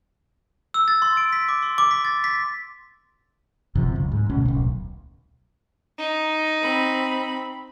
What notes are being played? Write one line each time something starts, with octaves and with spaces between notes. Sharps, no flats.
E6
A6
C6
D7
B6
D6
C6
D6
B6
A6
B6
F#1 F#2 C3 F3
C#2
G#2
D2 B2 C#4
D1 B1
D#4
C4 B5